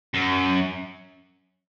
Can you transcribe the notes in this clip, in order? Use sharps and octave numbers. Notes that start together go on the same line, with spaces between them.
F#2